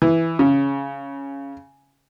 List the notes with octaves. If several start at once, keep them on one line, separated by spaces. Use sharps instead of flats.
E3
C#3